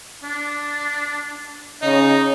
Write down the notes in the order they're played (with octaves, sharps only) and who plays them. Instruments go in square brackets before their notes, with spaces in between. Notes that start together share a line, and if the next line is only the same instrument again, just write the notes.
[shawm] D4
[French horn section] C#3 C#4 D#5 [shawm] D#4